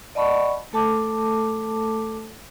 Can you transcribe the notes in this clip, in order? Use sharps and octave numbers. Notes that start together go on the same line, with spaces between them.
D5 D#5 F#5 A5 B5 C#6
A3 A4 A5 D6